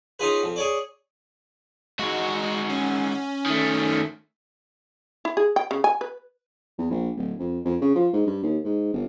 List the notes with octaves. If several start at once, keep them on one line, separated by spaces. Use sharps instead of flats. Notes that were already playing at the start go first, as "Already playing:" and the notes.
C#4 D#4 F4 G#4 B4
F2
G#4 C#5 D5
G#2 G#3 F#4
C#4
D#3 A3
E4
G#4
G5
C#3
G#5
B4
E2
A#1
D1
F2
F2
C#3
F3
G#2
G2
D#2
G#2
G1